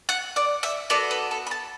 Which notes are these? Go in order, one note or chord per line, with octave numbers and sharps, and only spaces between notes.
F#5
D5
E5
B3 F#4 A4 D5
B4
A4
B5
A5